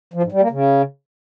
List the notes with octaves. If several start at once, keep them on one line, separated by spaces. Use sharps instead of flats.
F3
G#2
G3
A#3
C#3